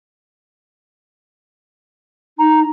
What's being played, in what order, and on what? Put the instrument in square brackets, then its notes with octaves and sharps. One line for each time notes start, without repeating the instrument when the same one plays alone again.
[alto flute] D#4 [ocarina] A#5